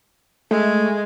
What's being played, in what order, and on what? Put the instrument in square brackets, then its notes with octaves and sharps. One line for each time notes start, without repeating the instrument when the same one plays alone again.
[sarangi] G#3 [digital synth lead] A3